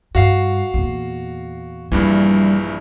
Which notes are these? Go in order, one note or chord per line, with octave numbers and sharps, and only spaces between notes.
G2 F#4 F5 C7
E2 A#2
A#1 G2 E3 G3